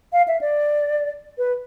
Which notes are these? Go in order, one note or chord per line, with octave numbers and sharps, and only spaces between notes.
F5
E5
D5
B4